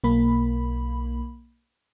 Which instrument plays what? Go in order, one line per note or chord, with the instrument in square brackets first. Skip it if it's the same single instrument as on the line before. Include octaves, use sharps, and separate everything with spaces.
[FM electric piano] B1 A#3 B5